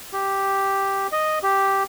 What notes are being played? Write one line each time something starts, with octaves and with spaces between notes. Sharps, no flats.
G4
D#5
G4